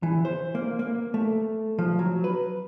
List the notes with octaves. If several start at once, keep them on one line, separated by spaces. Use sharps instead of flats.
E3
C5
A#3
A#3
A3
F3
F#3
B4